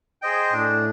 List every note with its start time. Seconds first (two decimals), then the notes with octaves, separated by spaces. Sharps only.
0.22 G#4 C5 D#5 G5
0.53 A2 D4